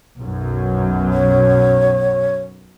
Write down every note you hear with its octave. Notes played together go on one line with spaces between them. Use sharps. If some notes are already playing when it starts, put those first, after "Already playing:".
B1 F#2 F#3
C#5